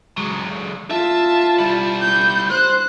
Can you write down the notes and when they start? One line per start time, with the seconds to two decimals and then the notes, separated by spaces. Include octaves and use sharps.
0.18 F#3 G#3
0.91 F4 E5 A5
1.59 G3 E4
2.01 G6
2.51 C5 F#6